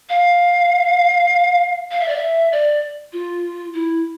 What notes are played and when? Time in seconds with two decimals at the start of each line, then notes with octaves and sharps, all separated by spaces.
0.09 F5
1.91 F5
2.00 E5
2.08 D5
2.16 E5
2.52 D5
3.13 F4
3.74 E4